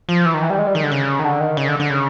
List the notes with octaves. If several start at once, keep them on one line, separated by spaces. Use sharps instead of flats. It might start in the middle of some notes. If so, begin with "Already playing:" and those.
F3
E3
D#3
E3
G3
G#3
G3
D#3
D3
C#3
D#3
D3
D#3
C#3
D3
D3
C#3